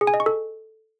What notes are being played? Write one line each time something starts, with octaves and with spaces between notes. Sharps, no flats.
G#4
G#5
D#5
C#6
A4